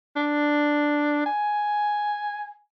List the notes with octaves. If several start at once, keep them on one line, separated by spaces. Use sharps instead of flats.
D4
G#5